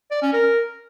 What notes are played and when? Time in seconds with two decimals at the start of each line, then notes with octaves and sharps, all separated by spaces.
0.11 D5
0.22 C#4
0.33 A#4